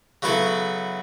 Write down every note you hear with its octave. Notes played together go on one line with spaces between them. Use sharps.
C#3 F#3 B3 E4 A4